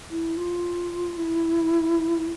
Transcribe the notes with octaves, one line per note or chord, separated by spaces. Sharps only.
E4
F4
E4